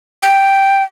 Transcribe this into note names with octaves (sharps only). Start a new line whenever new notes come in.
G5